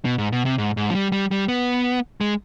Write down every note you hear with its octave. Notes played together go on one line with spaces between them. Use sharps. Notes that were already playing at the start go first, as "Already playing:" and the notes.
B2
G#2
B2
C3
G#2
G#2
F3
G3
G3
G3
B3
G#3